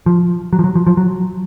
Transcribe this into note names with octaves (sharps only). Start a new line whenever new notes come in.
F3
F#3
F3
F#3
F3
F3
F#3